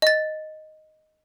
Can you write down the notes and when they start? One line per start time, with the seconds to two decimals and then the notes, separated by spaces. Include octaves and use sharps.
0.02 D#5 A6